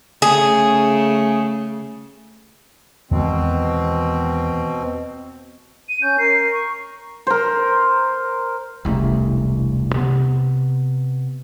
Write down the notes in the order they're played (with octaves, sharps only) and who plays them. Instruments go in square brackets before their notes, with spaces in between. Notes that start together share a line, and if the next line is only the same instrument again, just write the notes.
[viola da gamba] C#3 A3 [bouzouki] G#4
[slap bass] E2 D#3 G#3 [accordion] B2 C4
[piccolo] D#7
[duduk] C#4 [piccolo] G6
[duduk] A#4 [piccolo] C7
[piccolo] C#6
[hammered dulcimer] A#4 C5
[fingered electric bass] E1 C2 C#3 A3
C3 B3